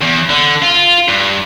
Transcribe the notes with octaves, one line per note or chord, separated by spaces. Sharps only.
E2
D3
F4
G2